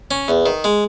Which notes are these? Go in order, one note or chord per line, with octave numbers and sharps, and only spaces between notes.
C#4
E2
D#3
G#3